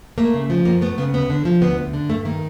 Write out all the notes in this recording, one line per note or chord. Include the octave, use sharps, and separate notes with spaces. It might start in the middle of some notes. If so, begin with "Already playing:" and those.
A3 A#3
C#3
F3
F#2 A#3
A3 B3
C#3 B3
D2 B3
D3
F3
D2 B3
D2
D3
G2 A3
D#3 A#3